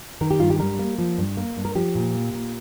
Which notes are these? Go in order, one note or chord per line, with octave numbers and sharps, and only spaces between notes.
D#3 A#4
G4
G2 F4
G4
G3 A#4
A#3
F3
G2
A#3
G2
A#4
F3 G4
A#2
A#3
A#2